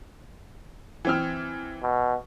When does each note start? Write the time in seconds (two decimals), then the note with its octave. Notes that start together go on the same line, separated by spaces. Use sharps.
1.05 E3 C4 F6
1.83 B2